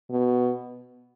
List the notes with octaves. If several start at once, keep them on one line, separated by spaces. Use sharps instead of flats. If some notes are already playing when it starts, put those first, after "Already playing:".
B2